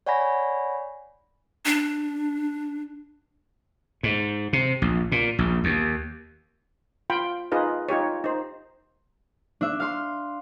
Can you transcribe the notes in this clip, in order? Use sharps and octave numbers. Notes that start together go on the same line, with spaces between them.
C#5 D5 F#5 G#5 B5 A#6
D4
G#2
C3
A#1
A#2
A#1
D#2
F4 F5 G5 B5 C6
D#4 F4 G#4 B4 D#5
D#4 F4 G4 C#5
D#4 C5
D4 E5
F5 C6